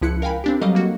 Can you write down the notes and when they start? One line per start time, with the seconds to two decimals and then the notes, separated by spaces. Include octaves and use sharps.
0.01 C#2 F3 E4 F#6 C#7
0.22 A#4 F5 G5 G#5 B5
0.44 C4 D4 G4
0.61 F#3 G3 A4 D#5 F5
0.75 A#3 F#4